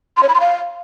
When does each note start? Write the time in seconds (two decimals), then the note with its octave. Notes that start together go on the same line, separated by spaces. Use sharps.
0.17 C6
0.23 C#5
0.29 B5
0.35 C6
0.40 F5